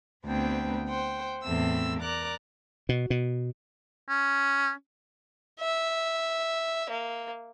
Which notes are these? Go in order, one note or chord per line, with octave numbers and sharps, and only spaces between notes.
D2 B3 C4 G5
C5 F#5 G5
E2 A2 C4 A4 E5 E6
A#4 D5 A#5 D6 F#6
B2
B2
C#4
E5
A#3